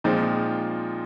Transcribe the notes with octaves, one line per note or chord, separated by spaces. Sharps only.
A#2 F3 G#3 C4 D#4